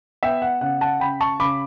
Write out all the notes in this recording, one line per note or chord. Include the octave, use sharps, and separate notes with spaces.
B3 E5 G5
F#5
C#3 F#5
F#5 A5
C#3 G5 B5
A5 C#6
C#3 B5 D6